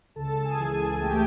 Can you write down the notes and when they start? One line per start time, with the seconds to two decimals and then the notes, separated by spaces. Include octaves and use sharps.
0.16 C#2 A4 A5
0.39 A5
0.44 G#4 G#5
0.59 E3
0.73 G#4 G#5
1.01 A3 G4 G5